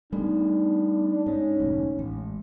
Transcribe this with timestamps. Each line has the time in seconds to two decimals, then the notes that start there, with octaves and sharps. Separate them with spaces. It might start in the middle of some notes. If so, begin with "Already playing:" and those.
0.12 G3 A3 B3 D4 D#4
1.26 G#2 C#4
1.60 F1 D2
1.99 A1 G#3